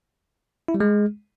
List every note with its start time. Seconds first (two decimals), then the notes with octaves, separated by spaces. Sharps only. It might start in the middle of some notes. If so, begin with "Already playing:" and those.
0.68 E4
0.74 G3
0.80 G#3